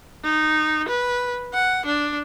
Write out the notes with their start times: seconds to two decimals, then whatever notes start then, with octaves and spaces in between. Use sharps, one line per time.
0.24 D#4
0.89 B4
1.54 F#5
1.86 D4